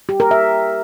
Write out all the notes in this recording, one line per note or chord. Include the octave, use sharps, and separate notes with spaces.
G4
A#4
E5